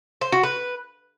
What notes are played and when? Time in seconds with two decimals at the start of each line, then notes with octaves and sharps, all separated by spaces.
0.21 C5
0.32 F#4
0.43 B4